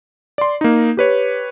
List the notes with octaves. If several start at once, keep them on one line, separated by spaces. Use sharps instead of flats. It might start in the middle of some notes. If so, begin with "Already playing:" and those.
D5 C6
A#3 D#4
G4 B4 C#5